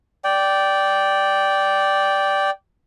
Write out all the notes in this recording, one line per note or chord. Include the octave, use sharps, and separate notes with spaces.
D5 G5